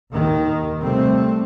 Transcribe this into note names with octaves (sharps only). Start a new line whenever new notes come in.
D#2 D#3
C3 G3 A3 C4